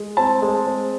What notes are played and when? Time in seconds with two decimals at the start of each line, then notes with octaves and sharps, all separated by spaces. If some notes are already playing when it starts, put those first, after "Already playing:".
Already playing: G#3
0.17 C4 A5
0.42 G#3
0.66 C4